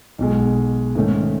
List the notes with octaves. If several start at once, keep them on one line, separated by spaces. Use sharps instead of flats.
B1 B2 G#3
G#2 D#3 A3 C#4